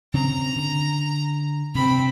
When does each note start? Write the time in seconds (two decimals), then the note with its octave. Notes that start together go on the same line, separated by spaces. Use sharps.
0.14 C#3 C4 A#5
0.56 D3
1.75 G2 C3 C4 B5